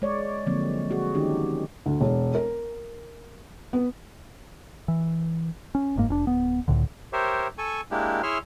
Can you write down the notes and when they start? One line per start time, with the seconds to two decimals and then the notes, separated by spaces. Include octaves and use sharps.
0.02 G#3 C#5 D5
0.46 D3 F3 F#3 G#3 A#3 C4
0.89 G3 F#4 G#4
1.15 D#3 F#3 C#4 D#4 G4
1.86 D2
2.00 E1
2.35 A#4
3.73 B3
4.88 E3
5.75 C#4
5.96 F#1 G#2 A#3
6.09 F1 C#4 D4
6.27 D1 B3
6.68 C#2 A2 D3
7.13 G4 A#4 C5 C#5 E5
7.58 A4 G#5 C#6
7.91 G#3 A#3 D4 E4 G4
8.23 E4 G#4 C#5 E5 C6 F6